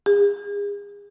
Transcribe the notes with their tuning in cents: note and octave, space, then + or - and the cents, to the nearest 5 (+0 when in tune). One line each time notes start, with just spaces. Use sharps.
G#4 -35